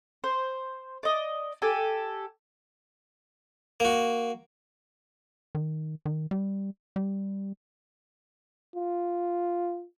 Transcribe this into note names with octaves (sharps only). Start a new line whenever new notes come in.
C5
D5 D#5
G4 A4 G#5
A#3 F#4
D#3
D#3
G3
G3
F4